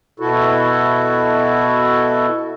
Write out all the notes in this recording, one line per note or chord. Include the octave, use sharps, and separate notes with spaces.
B2 E4 F#4 A4